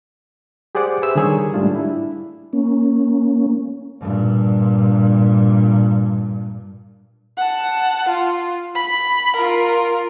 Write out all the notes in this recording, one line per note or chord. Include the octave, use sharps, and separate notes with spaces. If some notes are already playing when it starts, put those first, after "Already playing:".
G4 G#4 C5 D5 F#5 D6
G4 G#4 B4 C5 E5 E6
D3 D#3 G3 G#4 A#4 C#5
G#2 G3 A3 D4 F4
D4 E4
A#3 C#4
G2 A#2
F#5 A5
F4
B5
F4 A#4